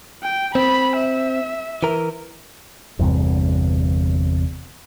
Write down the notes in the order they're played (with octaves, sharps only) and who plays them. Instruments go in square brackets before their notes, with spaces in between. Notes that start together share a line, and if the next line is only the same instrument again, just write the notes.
[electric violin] G5
[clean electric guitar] C4 [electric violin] B5
[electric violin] E5
[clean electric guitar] E3 A#4
[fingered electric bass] G1 E2 G2 C3